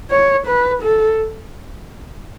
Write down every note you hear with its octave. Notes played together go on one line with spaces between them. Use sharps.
C#5
B4
A4